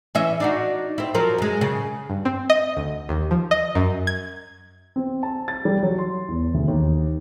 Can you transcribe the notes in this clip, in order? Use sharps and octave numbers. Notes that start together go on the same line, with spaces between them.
E3 C#4 E5
D4 D#4 F#4
C4 E4
F3 F#3 A#4
F#2 G#3
C#3
G2
C4
D#5
D2
D#2
F3
D#5
F#2
G#6
C4
A5
A6
G3
F#3
C6
E2
D2
D#2